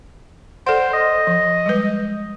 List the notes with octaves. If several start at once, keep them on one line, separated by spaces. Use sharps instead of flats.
A4 C5 D5 F#5
D#5
F3
G3 G#3 B4